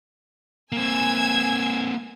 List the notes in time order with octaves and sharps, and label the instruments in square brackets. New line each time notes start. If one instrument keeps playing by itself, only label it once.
[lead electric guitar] A#3 C4 [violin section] G#5 E6 G#6